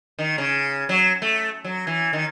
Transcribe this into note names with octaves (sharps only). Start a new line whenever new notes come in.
D#3
C#3
F#3
A3
F#3
E3
D#3